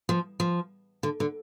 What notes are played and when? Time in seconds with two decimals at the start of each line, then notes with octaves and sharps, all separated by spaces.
0.09 F3
0.40 F3
1.03 D3
1.20 D3